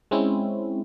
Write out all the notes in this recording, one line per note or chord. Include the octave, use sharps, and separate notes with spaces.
G#3 C4 C#4 E4